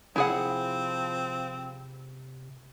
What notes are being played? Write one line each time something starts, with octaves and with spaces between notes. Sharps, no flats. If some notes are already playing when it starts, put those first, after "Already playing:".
C3 F3 C4 E4 G#4 F#5